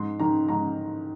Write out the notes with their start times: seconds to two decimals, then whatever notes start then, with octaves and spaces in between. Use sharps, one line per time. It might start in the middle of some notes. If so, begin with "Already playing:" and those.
Already playing: G#2 C6
0.20 D#3 A#5
0.49 G#2 A#5